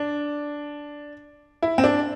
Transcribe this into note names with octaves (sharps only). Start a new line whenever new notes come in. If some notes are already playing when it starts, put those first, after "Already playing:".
Already playing: D4
E4
C4
D4